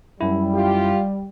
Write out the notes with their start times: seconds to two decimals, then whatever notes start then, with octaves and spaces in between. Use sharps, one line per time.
0.21 F#2 G3 E4
0.53 F4 G4